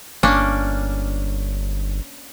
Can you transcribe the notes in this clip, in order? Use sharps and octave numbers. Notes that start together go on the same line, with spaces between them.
G1 A#3 C#4 D4